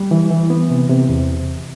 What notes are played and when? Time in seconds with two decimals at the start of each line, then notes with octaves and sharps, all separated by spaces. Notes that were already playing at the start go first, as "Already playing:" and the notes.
Already playing: G3
0.11 E3
0.31 E3
0.50 B3
0.70 C3
0.90 C3
1.09 E2